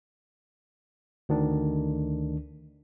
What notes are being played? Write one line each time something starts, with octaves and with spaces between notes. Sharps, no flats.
D2 D#3 D4